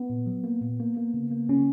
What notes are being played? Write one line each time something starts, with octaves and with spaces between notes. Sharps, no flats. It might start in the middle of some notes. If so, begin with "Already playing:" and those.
Already playing: B3
A#2
F#3
A#3
A#2
A#3
A#3
C#3
A#3
C#3 C#4